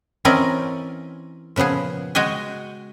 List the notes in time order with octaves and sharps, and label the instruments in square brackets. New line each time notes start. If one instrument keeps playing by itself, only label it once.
[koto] E3 C4 C#4 A#4 D5 D#5
A#2 C#3 F3 B3 G#4
G#3 F#4 D#5 G5 G#5